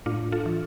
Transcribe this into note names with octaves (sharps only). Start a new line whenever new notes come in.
A2 D4 F4
F4 A4
E3